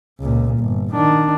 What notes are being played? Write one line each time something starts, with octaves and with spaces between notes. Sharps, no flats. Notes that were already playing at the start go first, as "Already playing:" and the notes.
C#2 A#2
G1
D#3 D4